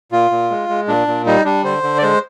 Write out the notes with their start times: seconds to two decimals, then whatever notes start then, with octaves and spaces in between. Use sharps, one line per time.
0.12 A#2 F4
0.31 A#2
0.50 G#3
0.69 G#3
0.88 A#2 D4
1.07 A#2
1.26 G3 D#4
1.45 G3 D4
1.64 D3 C5
1.83 D3
1.98 D5
2.02 G#3 C5